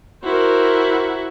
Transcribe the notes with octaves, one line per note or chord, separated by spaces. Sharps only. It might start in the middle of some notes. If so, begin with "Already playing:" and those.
E4 F#4 A#4 C5